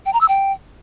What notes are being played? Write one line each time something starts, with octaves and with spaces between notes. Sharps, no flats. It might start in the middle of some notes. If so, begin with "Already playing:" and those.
G5
A#5
E6
G5